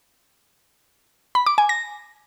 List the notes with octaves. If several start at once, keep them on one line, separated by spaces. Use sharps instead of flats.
B5
D6
G#5
A#6